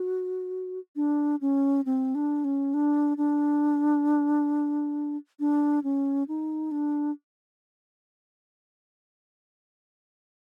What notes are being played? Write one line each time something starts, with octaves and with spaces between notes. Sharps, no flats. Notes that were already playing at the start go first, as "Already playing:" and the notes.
Already playing: F#4
D4
C#4
C4
D4
C#4
D4
D4
D4
C#4
D#4
D4